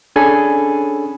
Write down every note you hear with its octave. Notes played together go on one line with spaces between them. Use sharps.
C#4 D4 G#4 A4 G#5 B5